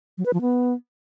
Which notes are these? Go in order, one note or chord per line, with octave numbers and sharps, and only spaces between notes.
F#3
B4
F3
B3